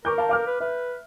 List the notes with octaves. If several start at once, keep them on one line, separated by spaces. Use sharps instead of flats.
A#4 C#6 D6 G6
F5 A5
F5 D6 F6
B4
B4 E5